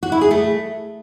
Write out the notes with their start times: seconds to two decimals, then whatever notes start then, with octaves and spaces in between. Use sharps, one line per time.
0.03 F#4
0.12 E4
0.21 G#4
0.31 A3